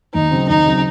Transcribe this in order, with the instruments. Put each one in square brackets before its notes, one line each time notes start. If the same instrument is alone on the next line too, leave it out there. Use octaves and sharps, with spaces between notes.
[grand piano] D#2 [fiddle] D#4
[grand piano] C#3 F#3 C4
[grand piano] D#2 [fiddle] D#4
[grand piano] C#3 F#3 C4